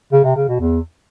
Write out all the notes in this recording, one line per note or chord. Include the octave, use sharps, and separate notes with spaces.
C#3
C3
C#3
B2
E2